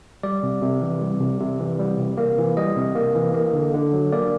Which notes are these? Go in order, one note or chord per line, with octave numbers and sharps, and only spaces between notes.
G3 D5
C3
C3
E3
G3
C3
C3
E3
G3
C3
A#3
E3
G3 D#5
C3
A#3
E3
A#3
D3
D3
F#3
A#3 D5